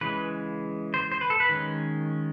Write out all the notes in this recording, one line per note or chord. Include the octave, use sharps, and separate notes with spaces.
C#3 E3 G#3 B4
C5
C5
B4
A4
B4
D#3 G#3 C#4